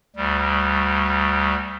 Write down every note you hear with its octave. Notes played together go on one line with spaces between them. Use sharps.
D2 G3